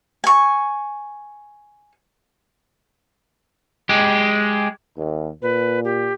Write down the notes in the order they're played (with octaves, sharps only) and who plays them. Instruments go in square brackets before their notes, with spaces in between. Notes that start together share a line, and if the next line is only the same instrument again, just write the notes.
[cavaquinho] G#5 C#6
[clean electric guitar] G#3 G4
[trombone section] D#2
[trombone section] A#2 [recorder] B4
[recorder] G4